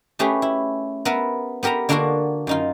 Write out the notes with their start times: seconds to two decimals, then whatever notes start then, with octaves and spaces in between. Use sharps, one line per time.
0.19 A3 C#4 G4 G#4 B4
0.42 E4
1.05 B3 A#4 B4 E5
1.63 B3 G4 A#4 E5 A#5
1.89 D3 A#3 D4 F4 F#4 A#4
2.47 F#2 D#4 F4